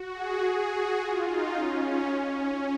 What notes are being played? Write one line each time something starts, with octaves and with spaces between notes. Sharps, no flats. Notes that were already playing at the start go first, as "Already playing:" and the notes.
Already playing: F#4
G#4
F#4
F4
D#4
C#4
C#4